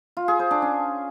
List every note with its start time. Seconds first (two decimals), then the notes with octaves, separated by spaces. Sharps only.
0.17 F4
0.28 G#4
0.39 C5
0.51 D4
0.62 C#4